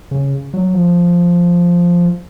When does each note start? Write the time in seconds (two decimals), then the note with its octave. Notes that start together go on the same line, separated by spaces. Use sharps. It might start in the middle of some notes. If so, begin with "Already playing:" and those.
0.11 C#3
0.54 F#3
0.74 F3